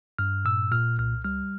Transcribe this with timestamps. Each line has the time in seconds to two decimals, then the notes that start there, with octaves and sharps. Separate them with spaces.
0.19 G2 F6
0.45 A#2 E6
0.71 A#2 F6
0.98 C2 F6
1.24 G3 F6